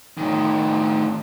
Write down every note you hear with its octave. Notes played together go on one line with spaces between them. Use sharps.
A2 D#3